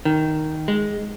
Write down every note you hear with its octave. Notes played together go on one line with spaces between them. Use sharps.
D#3
G#3